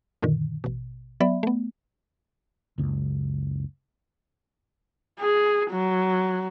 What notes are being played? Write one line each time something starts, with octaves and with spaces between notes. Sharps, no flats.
F#2 A#2 D3 D#3
A1 B2
F#3 B3 D5 E5 B5
A3 B3
F#1 C#2
G#4
F#3